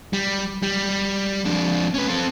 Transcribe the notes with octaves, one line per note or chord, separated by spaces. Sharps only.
G3
G3
F2 D4
C#4 B4
C4 A4